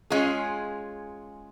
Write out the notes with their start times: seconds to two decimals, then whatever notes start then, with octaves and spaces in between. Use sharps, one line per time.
0.10 G#3 C#4 F4 G#4